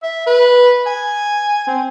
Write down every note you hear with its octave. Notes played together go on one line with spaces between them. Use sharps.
E5
B4
G#5
C4